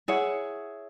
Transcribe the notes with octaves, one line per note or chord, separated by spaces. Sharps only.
E4 G#4 C#5 F#5